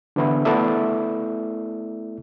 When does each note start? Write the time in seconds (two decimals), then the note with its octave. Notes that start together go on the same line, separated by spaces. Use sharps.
0.16 D3 E3 B3 E4
0.45 A3 B3 E4 A4 D5 E5